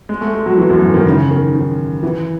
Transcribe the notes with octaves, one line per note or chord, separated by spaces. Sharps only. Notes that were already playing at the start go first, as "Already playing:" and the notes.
G#3
A3
G#3
F#3
E3
F#2
G#2
D#3
C#3
D#3
D#3
E3